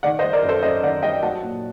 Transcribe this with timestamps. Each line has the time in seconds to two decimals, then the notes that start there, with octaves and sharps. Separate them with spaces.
0.03 D#3 D5 F#5
0.19 C5 D#5
0.23 G3
0.33 A#4 D5
0.43 F#2
0.49 A4 C5
0.63 F#2 C5 D#5
0.83 D#3 D5 F#5
1.03 G3 D#5 G5
1.22 F#3 F#5 A5
1.42 A#2